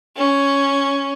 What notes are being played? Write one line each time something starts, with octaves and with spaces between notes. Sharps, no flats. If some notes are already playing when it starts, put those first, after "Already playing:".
C#4